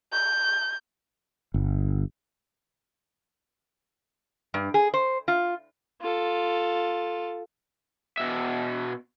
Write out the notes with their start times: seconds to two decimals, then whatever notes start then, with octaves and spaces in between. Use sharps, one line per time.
0.13 G6
1.54 G1
4.54 G2
4.74 G#4
4.94 C5
5.28 F4
6.01 F4 A4
8.17 B2 E5